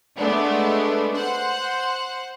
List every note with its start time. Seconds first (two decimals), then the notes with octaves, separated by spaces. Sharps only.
0.17 G#3 A3 B3 D4
1.15 C5 F#5